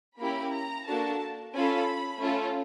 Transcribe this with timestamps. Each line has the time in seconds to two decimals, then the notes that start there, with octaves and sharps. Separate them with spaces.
0.20 A#3 C#4 E4 G4 B5
0.53 A#5
0.87 A#3 D4 F#4 A4 A5
1.54 C#4 F4 A4 B5
2.21 A3 C#4 F4 A4